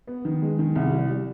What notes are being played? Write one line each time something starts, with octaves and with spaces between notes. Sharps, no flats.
B3
D#3
G#3
D#3
C2
G3
G3